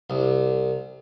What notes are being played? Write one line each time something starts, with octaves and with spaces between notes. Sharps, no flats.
C2